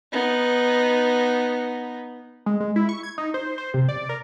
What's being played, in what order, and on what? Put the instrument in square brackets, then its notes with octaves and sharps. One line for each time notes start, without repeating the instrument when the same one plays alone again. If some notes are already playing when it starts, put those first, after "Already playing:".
[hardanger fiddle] B3 D#4
[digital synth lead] G#3
G#3
E4
C#6
G#6
D#4
C5
C5
C3
D5
A#4